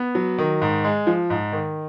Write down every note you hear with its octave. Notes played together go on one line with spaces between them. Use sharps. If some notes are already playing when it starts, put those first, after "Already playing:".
Already playing: B3
F#3
D#3
G#2
G#3
F3
G#2
D#3